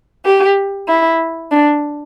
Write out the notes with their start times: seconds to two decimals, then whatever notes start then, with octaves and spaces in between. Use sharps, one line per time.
0.25 G4
0.88 E4
1.51 D4